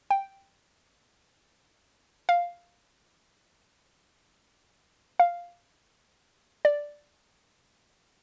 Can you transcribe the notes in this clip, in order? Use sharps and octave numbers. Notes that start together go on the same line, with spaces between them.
G5
F5
F5
D5